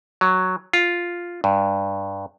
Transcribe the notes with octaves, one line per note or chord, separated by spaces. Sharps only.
F#3
F4
G2